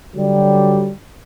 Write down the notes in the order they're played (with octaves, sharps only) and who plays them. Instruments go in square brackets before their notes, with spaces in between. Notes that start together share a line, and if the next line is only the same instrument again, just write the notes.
[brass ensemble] D3 F#3 G3